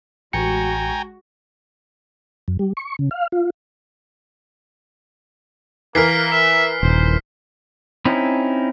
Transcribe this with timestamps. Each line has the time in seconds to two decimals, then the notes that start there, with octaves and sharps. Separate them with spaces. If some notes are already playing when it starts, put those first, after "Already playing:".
0.33 A1 G#3 F#4 G5 G#5 A#5 C#7
2.48 F#2
2.59 G3
2.77 C#6
2.99 C#3
3.11 F5
3.32 F4
5.95 E3 A#3 A#4 F6 B6 C7
6.32 E5
6.83 D#1 C5
8.05 C4 C#4 D#4 E4